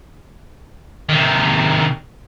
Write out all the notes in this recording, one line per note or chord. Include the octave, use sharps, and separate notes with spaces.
C3 D#3